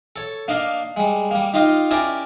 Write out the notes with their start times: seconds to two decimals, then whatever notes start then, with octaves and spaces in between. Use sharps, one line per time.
0.16 A4 C#5
0.48 A#3 D4 D#5 F5
0.97 G3 G#3
1.31 G3 A#3
1.54 D#4 F4 G4 D#5 F5
1.91 C#4 E4 G4 A#4 D5